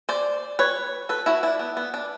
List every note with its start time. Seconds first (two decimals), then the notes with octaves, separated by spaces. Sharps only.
0.09 C5 D5
0.59 B4 C#5
1.09 A4 B4
1.26 E4 F#4
1.43 D4 E4
1.59 B3
1.77 B3
1.94 D4